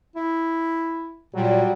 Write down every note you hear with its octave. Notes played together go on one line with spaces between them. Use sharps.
E4
A#2 F#3 G3